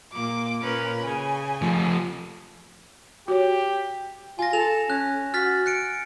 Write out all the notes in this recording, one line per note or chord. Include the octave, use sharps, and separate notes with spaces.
A#2 A#3 D6
A#2 C#4 A#4 B4
C#3 G#5
F3 A3
F#4 G4 C#5
F4 G#5 A#6
A4 F7
C#4 F#6
F#4 F6 A6 B6
F#6 C#7 D7